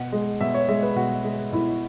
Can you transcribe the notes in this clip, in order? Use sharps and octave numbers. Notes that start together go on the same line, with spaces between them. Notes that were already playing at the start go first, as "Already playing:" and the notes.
Already playing: B2 F#5
G#3
B2 E5
C#5
G#3 E5
B4
B2 F#4
G#3
B2 E4